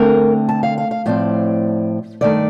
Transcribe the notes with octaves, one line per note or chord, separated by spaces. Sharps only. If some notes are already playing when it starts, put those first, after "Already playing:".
Already playing: D3 A3 C4 A#4
A5
F5
F5
F5
A2 F3 C4 D5
G2 D#3 A3 D5